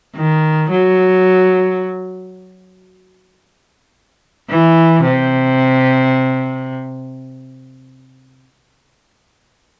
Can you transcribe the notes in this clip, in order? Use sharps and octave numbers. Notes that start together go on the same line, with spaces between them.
D#3
F#3
E3
C3